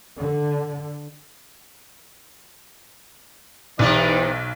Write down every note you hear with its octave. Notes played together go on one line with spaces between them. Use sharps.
D3
B1 C3 E3 D#4 B4 D5